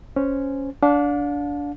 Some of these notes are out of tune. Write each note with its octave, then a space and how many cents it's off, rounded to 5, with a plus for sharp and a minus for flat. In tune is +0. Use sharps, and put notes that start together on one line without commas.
C#4 +0 C5 -5
D4 -20 F5 +40